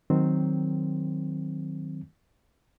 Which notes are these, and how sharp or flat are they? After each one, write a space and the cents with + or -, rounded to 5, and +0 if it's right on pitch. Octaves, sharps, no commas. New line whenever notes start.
D#3 +0 F#3 +0 C4 +0